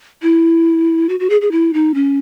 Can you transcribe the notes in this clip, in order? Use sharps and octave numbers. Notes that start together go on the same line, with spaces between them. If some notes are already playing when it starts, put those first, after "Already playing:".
E4
F#4
F#4
G#4
G#4
E4
D#4
C#4